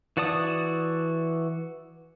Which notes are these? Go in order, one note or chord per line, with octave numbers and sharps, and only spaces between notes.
E3 F#4 D5 A5 D#6